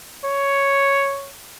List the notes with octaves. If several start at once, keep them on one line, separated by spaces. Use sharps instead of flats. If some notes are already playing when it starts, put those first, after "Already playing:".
C#5